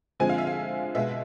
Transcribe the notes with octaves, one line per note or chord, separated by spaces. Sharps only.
D3 F3 G#3 C4 G#5
F5
E5
F5
B2 G#3 B3 E5